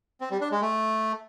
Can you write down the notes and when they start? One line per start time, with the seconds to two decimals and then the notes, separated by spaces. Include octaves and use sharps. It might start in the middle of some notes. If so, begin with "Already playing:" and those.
0.21 C4
0.31 G3
0.41 D4
0.51 G#3
0.61 A3